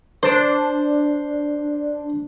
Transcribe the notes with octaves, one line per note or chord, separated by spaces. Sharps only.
D4 C5